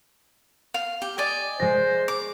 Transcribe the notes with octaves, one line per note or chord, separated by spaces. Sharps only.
F5
G4
D5 D#5 G#5
G#3 C5 A#6
D6